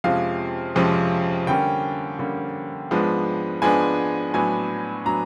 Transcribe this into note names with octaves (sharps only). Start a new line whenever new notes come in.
F2 C3 F3 G#3 C#4 F5
F2 C3 F3 G#3 C#4
D3 G3 A#3 C#4 G5
D3 G3 A#3 C#4
G#2 F3 G#3 B3 D4
G#2 F3 G#3 B3 D4 G#5
A2 F#3 B3 D4 G#5
A2 F#3 B3 D4 A#5